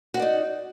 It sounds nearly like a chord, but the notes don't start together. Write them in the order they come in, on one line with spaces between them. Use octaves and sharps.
F#4 F#5 D5 D#4